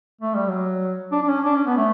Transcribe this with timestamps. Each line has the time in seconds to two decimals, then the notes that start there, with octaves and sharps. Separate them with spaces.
0.21 A3
0.34 G3
0.48 F#3
1.12 D4
1.22 D4
1.28 C#4
1.44 D4
1.55 C#4
1.66 B3
1.77 A3